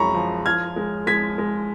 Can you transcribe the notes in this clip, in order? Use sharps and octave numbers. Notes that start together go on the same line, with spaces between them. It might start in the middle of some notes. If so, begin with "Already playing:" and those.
Already playing: F#2 F3 G#3 A#5 B5 C#6
F3
F3 F6 G#6
G#3
G#3 G#6 B6
G#3